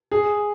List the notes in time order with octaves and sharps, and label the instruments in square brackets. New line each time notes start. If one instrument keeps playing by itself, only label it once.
[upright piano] G#4